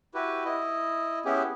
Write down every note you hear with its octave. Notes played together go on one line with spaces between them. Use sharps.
E4 F#4 G4 B4
E4 D#5
B3 C#4 E4 G4 G#4